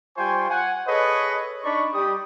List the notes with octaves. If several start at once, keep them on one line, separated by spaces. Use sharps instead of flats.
G3 F4 C5 G5 G#5 C#6
F#5 G#5
G#4 A4 B4 C#5 D#5
D4 D#4 D5 B5 C#6
G3 G4 D#6